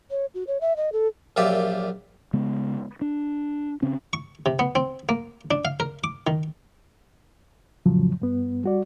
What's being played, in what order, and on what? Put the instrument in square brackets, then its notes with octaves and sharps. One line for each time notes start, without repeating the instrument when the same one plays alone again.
[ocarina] C#5
F#4
C#5
E5
D#5
A4
[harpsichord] A#1 F#2 F4 G4 D5 E5
[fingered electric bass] C#3 G#3 B3
D4
C#3 C4 C#4
[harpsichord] C#6
C3
B3
C4
A#3
D4
F5
A#4
D6
D#3
[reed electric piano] F2 A2 C#3 F3 F#3
G2 B3
G3 F#4 D5